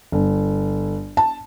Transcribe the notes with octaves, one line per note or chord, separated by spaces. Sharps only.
G1
A5